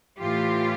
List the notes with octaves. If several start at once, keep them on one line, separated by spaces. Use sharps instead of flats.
A2 E3 F4 G4